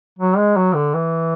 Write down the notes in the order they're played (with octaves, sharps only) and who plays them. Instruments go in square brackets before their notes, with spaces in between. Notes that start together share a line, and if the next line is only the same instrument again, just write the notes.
[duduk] F#3
G#3
F#3
D3
E3